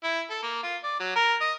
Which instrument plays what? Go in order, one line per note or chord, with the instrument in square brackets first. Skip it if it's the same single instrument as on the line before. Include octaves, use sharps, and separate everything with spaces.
[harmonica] E4
A4
A#3
F4
D5
F#3
A#4
D#5